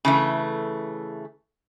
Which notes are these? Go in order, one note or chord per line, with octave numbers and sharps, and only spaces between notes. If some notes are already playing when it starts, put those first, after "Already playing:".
C#3 E3 A3